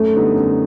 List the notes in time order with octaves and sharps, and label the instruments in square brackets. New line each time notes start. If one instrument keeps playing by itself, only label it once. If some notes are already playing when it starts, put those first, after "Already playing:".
Already playing: [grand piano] F#2 [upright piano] A3
[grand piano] D3 G3 B3 D#4
F#2